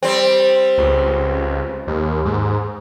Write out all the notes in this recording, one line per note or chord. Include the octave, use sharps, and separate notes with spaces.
G3 C4
C#2
D#2
G#2